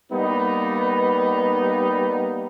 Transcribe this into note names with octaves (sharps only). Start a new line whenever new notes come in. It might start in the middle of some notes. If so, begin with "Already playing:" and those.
G3 A#3 B3 D#4